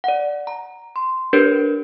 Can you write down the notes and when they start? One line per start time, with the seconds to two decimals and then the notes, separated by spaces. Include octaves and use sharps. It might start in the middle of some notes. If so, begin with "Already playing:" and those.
0.04 D5 F#5
0.47 A#5
0.96 C6
1.33 D4 G4 A#4 B4 C#5